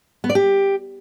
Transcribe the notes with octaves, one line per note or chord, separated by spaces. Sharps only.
B3
D5
G4